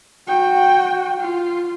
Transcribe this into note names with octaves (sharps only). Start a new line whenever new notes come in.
F#4 G5
F4